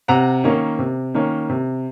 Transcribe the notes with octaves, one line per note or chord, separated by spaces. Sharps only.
C3 F#5 A#5
D#3 A#3 C#4
C3
D#3 A#3 C#4
C3